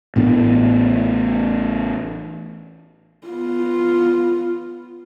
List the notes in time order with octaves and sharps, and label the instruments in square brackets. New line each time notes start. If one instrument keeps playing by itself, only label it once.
[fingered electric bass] A1 A2 B3 D4
[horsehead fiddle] B3 F4